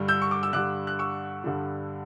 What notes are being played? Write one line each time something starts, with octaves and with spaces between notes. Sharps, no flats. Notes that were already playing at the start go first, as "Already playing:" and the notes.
Already playing: G2 D3 G3
E6 G6
C#6
D6
E6
G2 D3 G3 D6 F#6
F#6
C#6 E6
G2 D3 G3